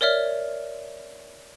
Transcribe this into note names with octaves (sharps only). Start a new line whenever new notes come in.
A#4 C#5 D5 E5 F6